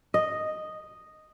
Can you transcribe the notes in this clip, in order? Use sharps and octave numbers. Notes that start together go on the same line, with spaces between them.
D#5